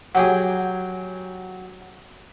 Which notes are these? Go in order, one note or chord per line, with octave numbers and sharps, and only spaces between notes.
F#3 G4 G#4